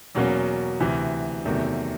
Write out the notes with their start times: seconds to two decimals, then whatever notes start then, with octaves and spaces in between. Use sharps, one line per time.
0.15 E2 B2 F#3 A#3 C#4
0.80 D2 C3 E3
1.45 E2 C3 D#3 F#3 A3